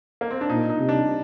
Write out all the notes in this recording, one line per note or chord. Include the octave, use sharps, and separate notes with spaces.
A#3
C4
D4
A#2 D#4
D#4
C3
D4